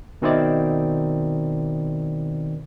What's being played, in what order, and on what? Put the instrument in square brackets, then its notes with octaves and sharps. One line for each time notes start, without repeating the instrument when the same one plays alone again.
[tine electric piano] B2 D#3 C4 E4 D5